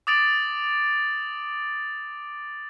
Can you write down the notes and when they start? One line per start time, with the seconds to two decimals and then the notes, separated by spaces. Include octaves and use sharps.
0.07 D6 D#6 A6 D7 F#7